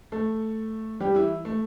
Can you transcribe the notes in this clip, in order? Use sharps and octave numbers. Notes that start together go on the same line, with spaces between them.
A3 A4
G3 G4
E3 E4
A3